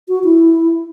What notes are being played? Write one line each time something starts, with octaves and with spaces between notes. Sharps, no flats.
F#4
E4